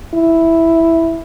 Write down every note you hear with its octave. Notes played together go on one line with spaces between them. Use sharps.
E4